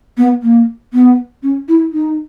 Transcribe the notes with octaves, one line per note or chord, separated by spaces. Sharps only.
B3
A#3
B3
C#4
E4
D#4